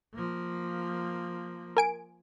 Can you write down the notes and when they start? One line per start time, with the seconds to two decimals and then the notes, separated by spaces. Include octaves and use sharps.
0.14 F3 A#3
1.77 A#4 G#5 D7